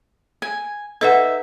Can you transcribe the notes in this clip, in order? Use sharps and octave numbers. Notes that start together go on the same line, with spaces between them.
G#5
D#4 A4 B4 E5 F#5